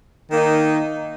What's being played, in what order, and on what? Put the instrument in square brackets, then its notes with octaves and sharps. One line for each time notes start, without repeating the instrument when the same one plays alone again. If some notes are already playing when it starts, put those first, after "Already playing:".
[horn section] D#3 A#3 D#4